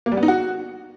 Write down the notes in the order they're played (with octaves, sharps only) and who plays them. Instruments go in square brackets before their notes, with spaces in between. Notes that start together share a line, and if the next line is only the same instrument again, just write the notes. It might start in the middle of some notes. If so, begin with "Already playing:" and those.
[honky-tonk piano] A#3
G3
B3
D#4
F#4